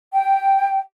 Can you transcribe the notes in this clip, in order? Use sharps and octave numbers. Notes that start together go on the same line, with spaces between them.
G5